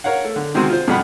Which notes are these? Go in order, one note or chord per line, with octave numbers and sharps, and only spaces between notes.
A#4 C#5 F5 F#5
A3
D3
C3 D#3 G#3 C4 F#4 G#4
F4 C5
F2 B2 G3 F#5 B5